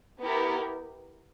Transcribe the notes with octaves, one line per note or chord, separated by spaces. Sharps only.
B3 E4 G4 A#4